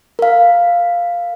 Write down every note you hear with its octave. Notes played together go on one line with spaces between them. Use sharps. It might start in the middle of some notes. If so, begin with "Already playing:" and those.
A#4 F5